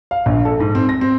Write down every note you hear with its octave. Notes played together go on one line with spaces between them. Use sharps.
F5
A#1
A4
G#2
C4
A#6
C4